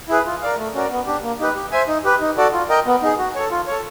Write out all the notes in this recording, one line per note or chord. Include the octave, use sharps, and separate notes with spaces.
E4 G#4 B4
F4
A#4 D5 F5
A3
C#4 F#4 A#4 D5
B3
D4 G4
A#3
D#4 G4 B4
G4
C5 E5 G#5
D#4
G4 B4
D#4
F#4 A4 D5
F4
A#4 D#5 G5
B3
D#4 G#4
F#4
A4 C#5
F4
A4 C#5